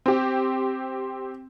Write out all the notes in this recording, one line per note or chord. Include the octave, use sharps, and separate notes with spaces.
C4 G4